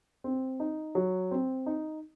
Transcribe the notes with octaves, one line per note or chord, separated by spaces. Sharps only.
C4
D#4
F#3
C4
D#4